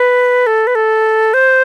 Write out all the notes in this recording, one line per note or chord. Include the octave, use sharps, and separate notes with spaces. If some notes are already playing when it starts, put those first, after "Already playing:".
Already playing: B4
A4
B4
A4
C5